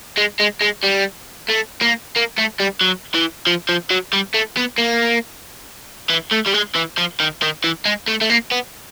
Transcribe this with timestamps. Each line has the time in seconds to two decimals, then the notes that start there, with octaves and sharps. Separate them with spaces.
0.17 G#3
0.40 G#3
0.62 G#3
0.84 G3
1.50 A3
1.82 A#3
2.16 A#3
2.38 A3
2.59 G3
2.81 F#3
3.15 E3
3.47 F3
3.69 F3
3.91 F#3
4.13 G3
4.34 A3
4.57 B3
4.78 A#3
6.10 E3
6.32 A3
6.47 G3
6.54 G#3
6.76 E3
6.98 F3
7.20 D#3
7.42 D#3
7.64 E3
7.86 G#3
8.08 A3
8.21 A3
8.30 A#3
8.51 B3